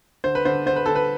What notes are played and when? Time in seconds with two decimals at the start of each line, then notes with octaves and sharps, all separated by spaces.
0.24 D3 C5
0.35 B4
0.45 D3 C5
0.66 D3 C5
0.76 B4
0.86 D3 A4
0.95 B4